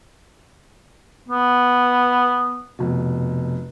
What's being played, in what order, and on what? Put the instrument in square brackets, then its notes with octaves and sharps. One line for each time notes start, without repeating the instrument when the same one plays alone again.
[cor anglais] B3
[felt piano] F1 B2